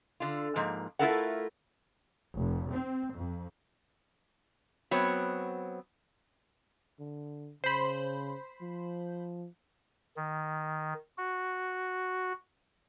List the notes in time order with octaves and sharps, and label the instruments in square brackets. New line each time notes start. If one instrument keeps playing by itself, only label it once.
[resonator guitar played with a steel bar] D3 F4
G#2 F3 A#3
A3 E4 F4 A4 A#4 F#5
[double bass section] F1
C4
F2
[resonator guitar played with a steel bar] F#3 B3 C4 C#5
[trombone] D3
[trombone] C#3 [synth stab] C5 B5
[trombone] F3
[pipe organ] D#3
F#4